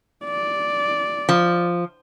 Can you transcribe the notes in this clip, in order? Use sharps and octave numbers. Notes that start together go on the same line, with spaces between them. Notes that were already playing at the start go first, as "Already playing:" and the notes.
D5
F3